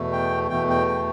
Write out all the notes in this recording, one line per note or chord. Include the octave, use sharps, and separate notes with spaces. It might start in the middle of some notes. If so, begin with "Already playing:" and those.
Already playing: E2 B2 A3
G5
E2 B2 A3 G5
G5
G5